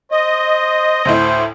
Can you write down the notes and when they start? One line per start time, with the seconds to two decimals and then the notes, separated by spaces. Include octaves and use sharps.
0.12 C5 D#5
1.05 D2 A2 C5